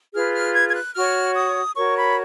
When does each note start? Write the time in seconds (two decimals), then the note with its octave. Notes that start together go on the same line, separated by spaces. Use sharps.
0.14 F4 G#4 B4 F6
0.34 F6
0.54 G#6
0.69 G#6
0.75 F#6
0.95 F#4 C#5 F6
1.35 D#6
1.76 F#4 A#4 C#5 C#6
1.97 B5